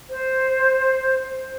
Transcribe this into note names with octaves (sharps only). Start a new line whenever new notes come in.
C5